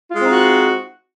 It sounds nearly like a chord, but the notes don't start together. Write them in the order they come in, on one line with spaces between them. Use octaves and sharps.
F4 G#3 C4 D#4 F#4